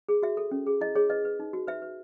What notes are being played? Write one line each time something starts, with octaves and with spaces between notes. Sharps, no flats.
G#4
F#4 E5
A4
C#4
G#4
E4 D#5
G#4 C#5
B4 D#5
B4
D#4
F#4
B4 E5
B4